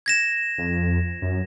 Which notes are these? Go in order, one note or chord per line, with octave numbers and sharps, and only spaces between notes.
G#6 A#6 E7
F2
F#2